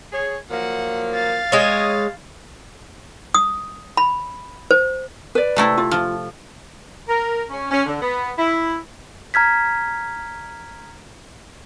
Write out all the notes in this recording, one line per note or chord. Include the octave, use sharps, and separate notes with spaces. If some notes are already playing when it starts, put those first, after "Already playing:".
G#4 C#5
F3 F#3 A#3 F#5
F5 A6
G#3 C#5 D#5
D#6
B5
C5
B4 D5
C3 A3 E4
F4
F3
A#4
C#4
C#4
D3
B3
E4
A#5 F6 G#6 B6